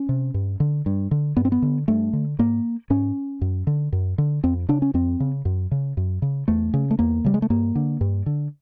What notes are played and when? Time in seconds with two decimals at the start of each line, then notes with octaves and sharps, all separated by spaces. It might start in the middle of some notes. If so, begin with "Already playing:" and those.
Already playing: C#4
0.09 C3
0.34 G2
0.60 D3
0.86 G2
1.11 D3
1.37 G2 B3
1.45 C4
1.52 B3
1.62 D3
1.88 G2 A3
2.13 D3
2.39 G#2 A#3
2.90 G#2 C#4
3.41 F#2
3.67 D3
3.93 F#2
4.18 D3
4.44 F2 C4
4.69 C#3 D4
4.82 C#4
4.94 F2 C4
5.20 C#3
5.45 F#2
5.72 C#3
5.97 F#2
6.22 C#3
6.48 E2 A3
6.74 C#3
6.91 A3
6.99 E2 A#3
7.25 C#3 G3
7.34 G#3
7.42 A3
7.50 G2 A#3
7.75 D3
8.01 G2
8.26 D3